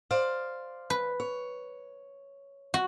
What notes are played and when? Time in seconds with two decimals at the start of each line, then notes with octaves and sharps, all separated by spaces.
0.11 C5 D5 F5
0.90 B4
1.20 C#5
2.74 F#4